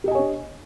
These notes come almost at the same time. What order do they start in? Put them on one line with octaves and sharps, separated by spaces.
G4 D#5 G#5 C#5 D4